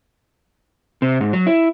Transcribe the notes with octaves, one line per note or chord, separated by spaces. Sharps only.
C3
G#2
F#3
E4